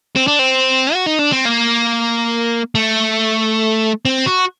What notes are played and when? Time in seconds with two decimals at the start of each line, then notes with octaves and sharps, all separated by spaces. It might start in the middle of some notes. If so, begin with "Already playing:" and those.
0.16 C4
0.27 D4
0.39 C4
0.94 F#4
1.06 D#4
1.19 D4
1.32 C4
1.45 A#3
2.75 A3
4.05 C4
4.26 F#4